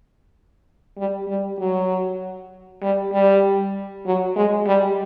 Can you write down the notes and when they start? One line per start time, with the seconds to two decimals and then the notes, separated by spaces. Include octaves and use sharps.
0.97 G3
1.28 G3
1.59 F#3
2.82 G3
3.13 G3
4.06 F#3
4.36 G#3
4.67 G3